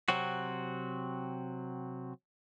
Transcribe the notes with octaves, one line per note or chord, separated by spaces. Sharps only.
C3 F#3 C4 F#4